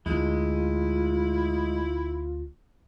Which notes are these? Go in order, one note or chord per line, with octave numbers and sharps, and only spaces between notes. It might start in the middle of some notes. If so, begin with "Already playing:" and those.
D2 G#3 E4 F4